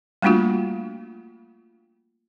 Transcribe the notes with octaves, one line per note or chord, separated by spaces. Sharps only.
G3 A3 A#3 D4 F4 F#4